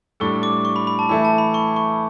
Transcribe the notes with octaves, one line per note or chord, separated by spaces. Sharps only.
A2 G3 D4 A4 C#6
D6
C#6
B5
B5
A5
E3 A3 E4 B5
A5
B5
C#6
C#6